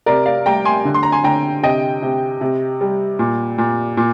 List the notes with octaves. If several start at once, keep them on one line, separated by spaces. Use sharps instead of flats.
C3 A#4 D5
D5 F5
G3 G5 A#5
G#5 C6
D3
C6
A#5
G#5 C6
D3 G5 A#5
C3 D#5 G5
C3
C3
G3
A#2
A#2
A#2